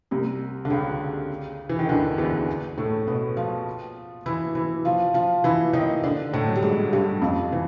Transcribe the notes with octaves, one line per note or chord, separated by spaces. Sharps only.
C2 C3
D3
C#2 C#3
E3
D#3
D2 D3
E2 E3
A2 A3
B2 B3
F3 F4
E3 E4
E3 E4
F3 F4
F3 F4
E3 E4
D#3 D#4
D3 D4
A2 A3
F#3
G3
G#2 G#3
G2 G3
F2 F3
E3